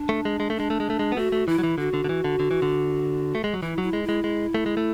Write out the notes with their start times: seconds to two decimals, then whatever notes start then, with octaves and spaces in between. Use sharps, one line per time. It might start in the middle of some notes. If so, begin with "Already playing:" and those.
Already playing: D4
0.09 A3
0.25 G#3
0.40 G#3
0.50 A3
0.56 G#3 D4
0.70 A3
0.80 G#3
0.90 A3
0.99 G#3
1.12 B3
1.17 A3 F#4
1.32 A3
1.48 E3 E4
1.58 F#3
1.64 E3
1.78 D3 F#4
1.94 D3
2.04 D3
2.09 E3
2.24 D3
2.40 D3
2.51 E3
2.62 D3
3.35 A3
3.44 G#3
3.54 F#3
3.63 E3 E4
3.78 F#3 E4
3.93 G#3
4.04 G#3 E4
4.24 G#3
4.54 A3
4.66 G#3
4.77 A3